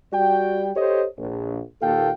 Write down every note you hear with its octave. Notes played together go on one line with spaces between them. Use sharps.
G3 F#4 D5 G5
G4 A4 C5 C#5 D#5
A#1
D#2 A#2 A4 F5 G5